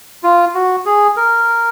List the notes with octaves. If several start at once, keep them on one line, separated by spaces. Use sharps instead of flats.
F4
F#4
G#4
A#4